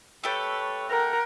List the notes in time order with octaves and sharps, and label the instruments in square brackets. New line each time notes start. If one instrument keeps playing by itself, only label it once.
[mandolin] A3 G4 A4 [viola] B4 C#5
[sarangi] A#4 [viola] F#5 G5